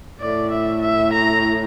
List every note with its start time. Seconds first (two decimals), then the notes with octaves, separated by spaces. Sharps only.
0.20 A2 D5
0.52 E5
0.82 E5
1.13 A#5